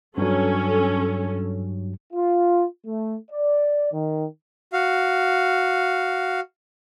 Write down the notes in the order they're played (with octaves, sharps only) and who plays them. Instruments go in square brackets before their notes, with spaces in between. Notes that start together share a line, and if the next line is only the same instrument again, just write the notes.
[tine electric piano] G2 F#3 [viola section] C#4 A4
[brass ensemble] F4
A3
D5
D#3
[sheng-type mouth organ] F#4 F5